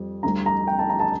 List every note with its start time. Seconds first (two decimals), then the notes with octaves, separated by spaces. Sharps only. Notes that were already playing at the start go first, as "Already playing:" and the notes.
Already playing: F2 G3
0.23 D2 D3 G3 A#5
0.46 A#5
0.67 G5
0.79 A5
0.89 A#5
1.00 A5